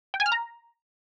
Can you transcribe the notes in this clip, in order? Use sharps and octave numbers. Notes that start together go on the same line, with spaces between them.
G5
G#5
F6
A#5